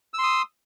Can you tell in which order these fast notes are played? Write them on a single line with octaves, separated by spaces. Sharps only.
E6 C6 D#6